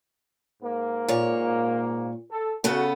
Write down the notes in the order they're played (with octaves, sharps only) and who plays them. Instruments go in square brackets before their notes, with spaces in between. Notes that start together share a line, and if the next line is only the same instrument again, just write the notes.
[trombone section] G#2 A#3
[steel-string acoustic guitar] A#2 C#5
[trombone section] A4
[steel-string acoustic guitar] C#3 B3 A4 [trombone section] F#4